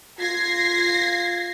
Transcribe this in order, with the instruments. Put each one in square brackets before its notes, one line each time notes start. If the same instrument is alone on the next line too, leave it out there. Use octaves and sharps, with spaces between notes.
[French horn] F4 [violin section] G#6 A#6 C7